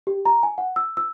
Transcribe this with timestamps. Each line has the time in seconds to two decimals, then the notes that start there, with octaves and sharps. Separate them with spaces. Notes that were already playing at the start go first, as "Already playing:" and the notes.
0.07 G4
0.25 A#5
0.43 G#5
0.58 F#5
0.76 E6
0.97 E6